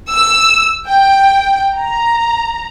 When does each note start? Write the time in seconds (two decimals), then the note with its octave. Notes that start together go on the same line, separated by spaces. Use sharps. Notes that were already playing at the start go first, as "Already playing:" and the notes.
0.11 E6
0.86 G5
1.78 A#5